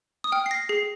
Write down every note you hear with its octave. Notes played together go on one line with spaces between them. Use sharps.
D#6
G5 F6
C7
A#6
G#4 C7